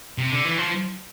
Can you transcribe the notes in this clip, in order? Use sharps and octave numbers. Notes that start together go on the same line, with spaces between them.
C3
D3
E3
F3